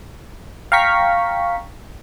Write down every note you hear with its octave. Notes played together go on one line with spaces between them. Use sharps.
F5 G5 A#5 C#6 B6